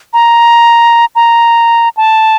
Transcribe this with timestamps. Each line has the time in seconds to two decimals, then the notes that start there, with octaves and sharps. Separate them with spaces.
0.13 A#5
1.15 A#5
1.97 A5